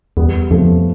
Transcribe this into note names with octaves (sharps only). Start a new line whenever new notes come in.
E2 G3 B3
F2 F3 A3